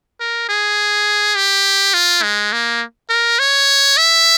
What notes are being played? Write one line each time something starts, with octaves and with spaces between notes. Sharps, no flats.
A#4
G#4
G4
F4
G#3
A#3
A#4
C#5
E5